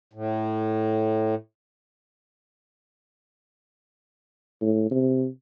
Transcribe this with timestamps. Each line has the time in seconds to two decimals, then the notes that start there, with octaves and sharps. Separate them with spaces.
0.13 A2
4.62 A2
4.91 C3